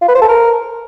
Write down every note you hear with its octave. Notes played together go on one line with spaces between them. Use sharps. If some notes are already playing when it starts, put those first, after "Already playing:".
F4
B4
C5
A4
A#4